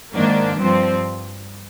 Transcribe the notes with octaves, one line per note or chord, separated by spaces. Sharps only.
G#2 D#3 A#3 D4
G2 F3 C4